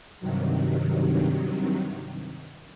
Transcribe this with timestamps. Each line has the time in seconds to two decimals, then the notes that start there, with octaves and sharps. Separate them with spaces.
0.20 G2 C3 D#3 F#3